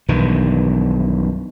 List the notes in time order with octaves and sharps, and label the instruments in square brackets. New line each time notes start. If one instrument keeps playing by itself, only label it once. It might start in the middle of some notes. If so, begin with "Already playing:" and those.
[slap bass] B1 G2 D#3 E3